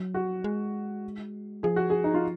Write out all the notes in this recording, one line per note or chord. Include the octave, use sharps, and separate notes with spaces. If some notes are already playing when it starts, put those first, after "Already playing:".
Already playing: F#3
F#4
G#3
F3 G#4
F#4
G#4
D#4
F4